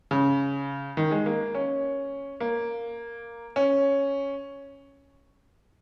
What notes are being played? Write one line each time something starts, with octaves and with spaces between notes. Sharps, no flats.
C#3
D#3
G#3
A#3
C#4
A#3
C#4